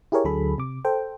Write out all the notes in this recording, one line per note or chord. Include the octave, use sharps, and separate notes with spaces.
E4 G4 G#4 A#4 C#5
D2 D3 F#3 G#4 A4 B5
C3 D6
A4 C5 G5